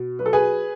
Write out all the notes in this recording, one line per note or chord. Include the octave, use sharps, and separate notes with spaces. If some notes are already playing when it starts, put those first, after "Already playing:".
Already playing: B2
F#3 B4
A4
G#4 B4